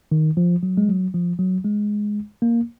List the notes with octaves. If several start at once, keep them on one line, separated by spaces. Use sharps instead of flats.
D#3
F3
F#3
G#3
F#3
F3
F#3
G#3
A#3